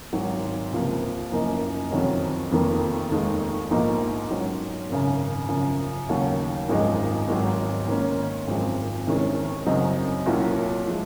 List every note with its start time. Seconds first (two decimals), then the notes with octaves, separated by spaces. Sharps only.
0.13 G#1 G#2 F#3
0.72 C#2 C3 F3 A#3
1.32 F#1 F#2 F3 A#3 D#4
1.91 F2 C3 D#3 F#3 C#4
2.52 F1 F2 D#3 A#3
3.10 F1 D#2 D#3 G#3
3.71 A#1 G#2 F3 A#3 D#4
4.30 G#2 F#3 C#4
4.89 G#1 F#2 C#3
5.49 F#2 C#3 F3
6.09 D#2 C#3 F#3
6.68 G#1 F#2 F3 G#3 D#4
7.28 G#1 G#2 F#3
7.88 G#2 D#3 A#3 C#4
8.47 G#1 F#2 F3 G#3 C4
9.07 C2 C3 D#3 G#3 C#4
9.66 F#2 C#3 F#3 C4 D#4
10.26 C2 A#2 F#3 C#4
10.87 F3 G#3